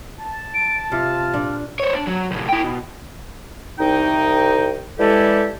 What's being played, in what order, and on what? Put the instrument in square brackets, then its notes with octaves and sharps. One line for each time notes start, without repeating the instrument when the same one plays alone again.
[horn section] A5
[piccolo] D7
[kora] C3 [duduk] F4 [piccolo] F6
[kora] A#2 D4
[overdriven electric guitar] C5 C#5
D4
F#3
C2 A2
E4 G5
B2
[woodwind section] C2 D#4 G5
E3 G3 G#3 E4 G4 A4